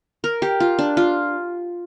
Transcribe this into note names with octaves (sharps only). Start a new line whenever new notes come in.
A#4
G4
F4
D4
F4